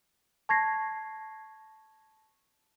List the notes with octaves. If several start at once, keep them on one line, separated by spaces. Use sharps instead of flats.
A5 C#6 G#6 A#6 C7